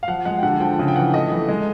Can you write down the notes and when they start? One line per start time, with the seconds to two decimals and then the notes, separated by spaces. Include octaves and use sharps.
0.03 F5
0.08 F3 F#5
0.25 G#3 F#5
0.39 G5
0.43 D3 F#5
0.60 F3 G5
0.79 C#3
0.88 G5
0.96 E3 F#5
1.14 A3 D#5
1.31 E3
1.49 G#3